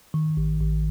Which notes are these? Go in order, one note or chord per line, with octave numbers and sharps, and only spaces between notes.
D#3
A1
A1